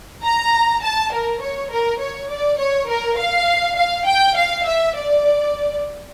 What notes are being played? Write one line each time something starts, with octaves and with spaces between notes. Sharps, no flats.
A#5
A5
A#4
C#5
A#4
C#5
D5
C#5
A#4
F5
F5
G5
F5
E5
D5